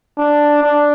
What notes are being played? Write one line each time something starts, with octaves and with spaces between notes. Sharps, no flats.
D4
D4